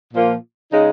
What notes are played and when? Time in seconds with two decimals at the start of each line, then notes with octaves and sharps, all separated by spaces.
0.13 A#2 F3 A#3 F4
0.71 C#3 G#3 D#4